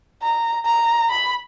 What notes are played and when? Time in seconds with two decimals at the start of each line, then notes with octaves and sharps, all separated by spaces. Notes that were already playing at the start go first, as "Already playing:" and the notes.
0.22 A#5
0.66 A#5
1.09 B5